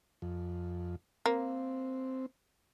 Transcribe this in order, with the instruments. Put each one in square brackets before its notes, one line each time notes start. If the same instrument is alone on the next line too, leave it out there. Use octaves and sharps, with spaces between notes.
[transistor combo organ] F2
[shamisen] A#3 [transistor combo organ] C4